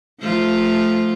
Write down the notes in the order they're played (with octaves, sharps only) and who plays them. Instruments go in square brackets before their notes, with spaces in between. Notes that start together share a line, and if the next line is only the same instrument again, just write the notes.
[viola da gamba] F3 A3 F4